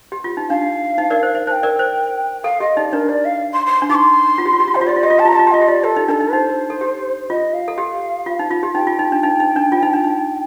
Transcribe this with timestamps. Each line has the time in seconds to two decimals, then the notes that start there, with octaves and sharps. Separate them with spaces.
0.12 G4
0.24 F4
0.37 D#4
0.49 D4 F5
0.98 D#4
1.10 A#4 D5
1.23 C5
1.35 C5
1.47 C5 G5 A5
1.63 A#4 D5
1.79 C5
2.44 A4 F5
2.60 G4 D#5
2.77 D#4 D5
2.93 D4 A#4
3.09 D5
3.25 F5
3.53 C6
3.66 C6
3.82 D4
3.90 D#4 D6
3.95 C6
4.38 F4
4.46 G4
4.53 F4
4.60 G4
4.68 F4
4.74 G4 C5
4.81 F4
4.87 G4 D5
4.96 F4
5.03 G4 D#5
5.10 F4
5.18 G4 A5
5.25 F4
5.28 A#5
5.32 G4
5.35 F4 A5
5.47 G4
5.51 F4 D#5
5.61 G4
5.68 F4 D5
5.84 G4 A4
5.96 D#4
6.08 D4 A4 A#4
6.21 D#4
6.33 D#4 C5
6.70 A4
6.81 G4
7.30 F4 D#5
7.54 F5
7.68 A4
7.78 G4
8.26 F4
8.39 D#4
8.51 F4
8.63 G4
8.75 D#4 G5
8.87 F4
8.99 D#4
9.12 D4
9.23 D#4
9.40 D#4
9.56 D4
9.72 F4
9.83 D#4
9.93 D4
10.04 D#4